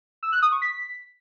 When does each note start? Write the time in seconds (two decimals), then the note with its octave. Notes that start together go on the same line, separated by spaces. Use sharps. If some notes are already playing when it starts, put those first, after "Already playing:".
0.23 E6
0.32 F#6
0.42 D#6
0.52 C#6
0.62 B6